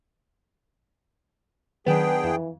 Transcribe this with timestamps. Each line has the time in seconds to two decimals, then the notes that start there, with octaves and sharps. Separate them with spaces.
1.87 D#3 F#3 B3 D4 G#4 B4 G5
2.24 F2 E3